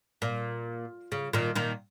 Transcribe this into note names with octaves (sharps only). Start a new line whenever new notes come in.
A#2
C#3
A#2 D#3
A#2 D#3